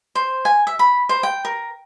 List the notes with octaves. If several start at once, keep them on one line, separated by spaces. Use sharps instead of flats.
C5
G#5
E5
B5
C5
G5
A#4